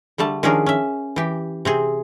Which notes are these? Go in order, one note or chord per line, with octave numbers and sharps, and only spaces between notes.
D3 G3 A3 A5
D#3 F3 C#4 D4 G#4 A#4
C#4 E5
E3 G4
C3 C4 G#4